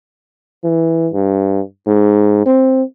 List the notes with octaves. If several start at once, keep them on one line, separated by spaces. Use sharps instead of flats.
E3
G2
G#2
C4